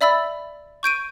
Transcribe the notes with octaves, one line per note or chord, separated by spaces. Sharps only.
D5 E5 B5 E6 A6
C#6 G6 D7 D#7